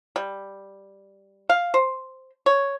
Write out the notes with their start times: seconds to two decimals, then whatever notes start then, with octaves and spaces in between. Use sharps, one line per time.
0.16 G3
1.49 F5
1.74 C5
2.46 C#5